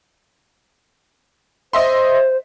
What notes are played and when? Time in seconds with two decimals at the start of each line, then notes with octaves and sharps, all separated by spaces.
1.73 C5 D#5 E5 C6